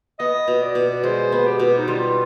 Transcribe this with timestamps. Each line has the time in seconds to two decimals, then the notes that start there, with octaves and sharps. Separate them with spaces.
0.19 B3 D#5
0.48 B2
0.61 D5
0.75 B2
1.03 G#3 C5
1.32 B3
1.46 G4
1.59 B2
1.78 D#4
1.88 G3 F4